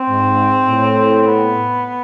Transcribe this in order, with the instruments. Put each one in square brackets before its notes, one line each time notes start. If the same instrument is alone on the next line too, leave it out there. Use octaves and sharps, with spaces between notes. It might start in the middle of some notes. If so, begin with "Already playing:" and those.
Already playing: [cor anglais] C4
[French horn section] G#2
A2
[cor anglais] B3